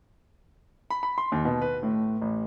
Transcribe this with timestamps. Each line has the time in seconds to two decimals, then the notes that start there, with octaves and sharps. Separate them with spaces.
0.90 B5
1.03 B5
1.18 C6
1.32 D#2
1.45 B2
1.62 B4
1.83 A2
2.21 A1